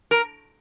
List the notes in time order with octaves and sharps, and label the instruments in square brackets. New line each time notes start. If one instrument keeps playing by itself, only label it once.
[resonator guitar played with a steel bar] A#4